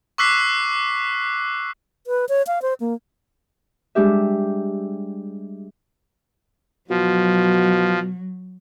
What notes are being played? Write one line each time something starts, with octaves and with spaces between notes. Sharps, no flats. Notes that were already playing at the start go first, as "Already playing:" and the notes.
C#6 D6 E6 F#6 B6 C7
B4
C#5
F5
C5
A#3
G3 G#3 D4 G4 E5
B2 F3 F#3